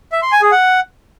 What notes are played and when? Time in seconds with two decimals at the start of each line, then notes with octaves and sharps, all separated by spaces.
0.12 E5
0.22 C6
0.32 G#5
0.42 G#4
0.52 F#5